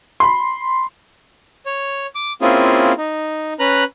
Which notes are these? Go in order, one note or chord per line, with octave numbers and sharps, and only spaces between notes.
B5 C6
C#5
D6
A#3 C4 C#4 E4 F4 G#4
D#4
C#4 B4 A#5 F#6